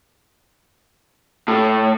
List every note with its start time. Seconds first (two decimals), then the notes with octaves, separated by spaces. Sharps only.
1.48 A2